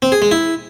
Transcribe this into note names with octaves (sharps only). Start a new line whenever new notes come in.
C4
G#4
G#3
E4